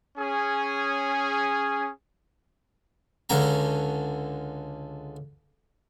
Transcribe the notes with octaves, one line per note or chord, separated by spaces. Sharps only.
C#4 G#4
C#2 D3 C#4 A#5